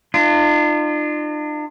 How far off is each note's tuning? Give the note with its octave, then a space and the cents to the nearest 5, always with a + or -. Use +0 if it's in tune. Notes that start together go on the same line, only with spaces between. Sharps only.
D4 +45 F4 -30